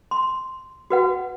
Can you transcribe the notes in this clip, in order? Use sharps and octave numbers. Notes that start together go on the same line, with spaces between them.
C6
F#4 B4 F#5